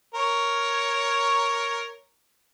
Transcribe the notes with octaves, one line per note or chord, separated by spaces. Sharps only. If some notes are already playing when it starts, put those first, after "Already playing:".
A#4 C#5